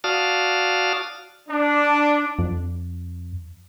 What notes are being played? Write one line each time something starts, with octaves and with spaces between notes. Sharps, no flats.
F#4 D5 F5 A5 D#6 F6
D4
F2